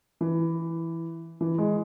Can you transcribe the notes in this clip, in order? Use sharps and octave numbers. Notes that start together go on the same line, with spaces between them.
E3
E3
G#3